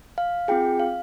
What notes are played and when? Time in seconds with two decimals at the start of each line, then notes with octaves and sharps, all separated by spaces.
0.18 F5
0.48 C4 F4 G#4 G5
0.79 F5